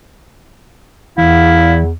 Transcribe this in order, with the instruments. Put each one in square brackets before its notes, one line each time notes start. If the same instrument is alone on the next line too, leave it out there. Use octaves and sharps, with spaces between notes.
[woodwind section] E2 [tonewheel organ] E3 [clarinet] E4 [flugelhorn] F5